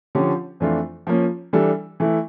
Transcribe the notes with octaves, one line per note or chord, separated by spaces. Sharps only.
D3 F3 C#4 G4 C#5
F2 E3 A3 D4 F4
F3 A#3 C#4
E3 G3 D4 A4
E3 A3 E4